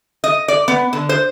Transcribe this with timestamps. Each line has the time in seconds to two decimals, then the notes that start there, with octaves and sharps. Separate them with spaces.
0.24 D#5
0.48 D5
0.68 B3
0.93 D3
1.09 C5